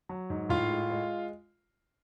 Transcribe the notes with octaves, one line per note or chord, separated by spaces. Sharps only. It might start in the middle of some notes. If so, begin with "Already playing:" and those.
F#3
G#2
A2 F4 F5
G#3
G#3